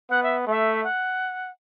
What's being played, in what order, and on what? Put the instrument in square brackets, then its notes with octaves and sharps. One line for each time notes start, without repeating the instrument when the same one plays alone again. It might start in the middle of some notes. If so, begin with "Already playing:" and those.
[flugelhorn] B3 [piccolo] F#5
[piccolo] E5
[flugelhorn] A3 [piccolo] E5
[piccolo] F#5